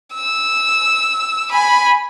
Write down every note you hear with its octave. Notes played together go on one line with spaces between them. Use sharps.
E6
G#5 B5